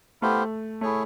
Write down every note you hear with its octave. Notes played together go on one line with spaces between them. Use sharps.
A3 B3 E4 G4 C5 F5
A3 E4 G#4 C#5